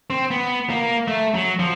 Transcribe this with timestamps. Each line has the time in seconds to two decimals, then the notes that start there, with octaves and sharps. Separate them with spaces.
0.10 C4
0.31 B3
0.70 A#3
1.08 A3
1.34 F#3
1.59 F3